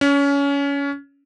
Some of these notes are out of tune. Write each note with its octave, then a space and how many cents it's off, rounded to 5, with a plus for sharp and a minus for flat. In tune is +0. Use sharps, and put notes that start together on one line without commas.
C#4 +25